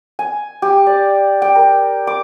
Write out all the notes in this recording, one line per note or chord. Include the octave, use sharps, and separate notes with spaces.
G#5
G4
D5
G5
A#4
D6